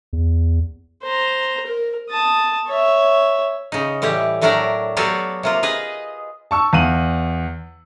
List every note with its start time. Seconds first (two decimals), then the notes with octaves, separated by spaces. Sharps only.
0.13 E2
1.03 C5 A#5
1.66 A#4
2.10 A5 D#6
2.68 C#5 E5
3.72 C#3 D#4
4.02 A2 E3 G3 G4
4.41 A2 F#3 A3 D4 A#4 D5
4.97 F#3 B3 F#4 G4 A4 F5
5.43 C3 A#3 F4
5.63 G#4 B4 D#5
6.51 A5 C#6 E6
6.73 E2 F5 D#7 F#7